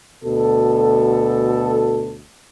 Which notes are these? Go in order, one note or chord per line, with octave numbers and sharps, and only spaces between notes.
D2 B2 A4